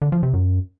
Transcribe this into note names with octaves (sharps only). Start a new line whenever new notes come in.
D3
F3
C3
F#2